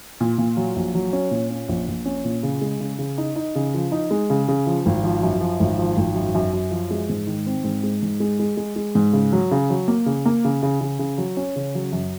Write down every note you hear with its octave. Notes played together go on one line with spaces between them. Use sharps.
A#2
A#2
F#3
A#1
F#3
C#4
A#2
C#4
A#1
A#1
C#4
A#2
C#3
G#3
C#3
C#3
D#4
D#4
C#3
F3
D#4
G#3
C#3
C#3
F3
G#1
F3
F#2
F3
G#1
F3
G#1
F#2
F#2
F#2
F3
G#3
G#2
D#3
C4
G#2
G#3
G#2
G#3
G#3
G#3
G#3
G#2
C#3
F#3
C#3
F#3
A#3
C#3
A#3
C#3
C#3
C#3
C#3
F#3
C#4
C#3
F#3
F#2